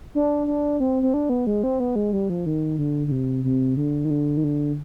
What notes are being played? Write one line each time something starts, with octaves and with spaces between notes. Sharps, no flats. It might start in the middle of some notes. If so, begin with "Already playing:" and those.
D4
D4
C4
C4
D4
B3
G#3
C4
B3
G#3
G3
F3
D#3
D3
D3
C3
C3
D3
D#3
D3
D#3
D3